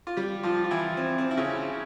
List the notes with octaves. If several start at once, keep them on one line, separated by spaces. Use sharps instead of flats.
F4
G3 G4
F3 F4
F4
E3 E4
C4
C4
E4
C#3 C#4